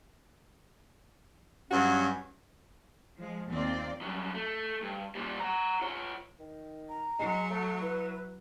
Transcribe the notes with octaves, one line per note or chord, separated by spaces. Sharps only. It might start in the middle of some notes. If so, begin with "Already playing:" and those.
G2 F#3 C#4 F#4
F3 G#3
D#2 A#3 C4 F4 D5
G2 F#3
A3
G2
A#2 G3
F#5 A#5
F4 C#5
D#3
A#5
F#3 G#3
A3
E4 B4